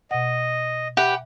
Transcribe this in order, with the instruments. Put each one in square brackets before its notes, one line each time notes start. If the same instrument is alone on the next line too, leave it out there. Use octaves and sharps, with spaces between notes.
[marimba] B2 F#5 [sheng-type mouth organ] D#5
[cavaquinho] G4 B4 G5 [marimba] E5 [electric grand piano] F#5